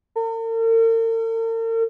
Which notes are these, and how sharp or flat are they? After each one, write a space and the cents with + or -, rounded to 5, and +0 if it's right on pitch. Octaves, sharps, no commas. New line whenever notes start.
A#4 -45